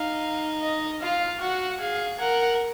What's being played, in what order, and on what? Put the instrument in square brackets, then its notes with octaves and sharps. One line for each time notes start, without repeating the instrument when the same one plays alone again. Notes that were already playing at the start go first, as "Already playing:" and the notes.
Already playing: [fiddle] D#4 [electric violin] F5
[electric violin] D#5
[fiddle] F4 [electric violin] F5
[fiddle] F#4 [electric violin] F#5
[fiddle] G#4 [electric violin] F5
[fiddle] A#4 [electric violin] F#5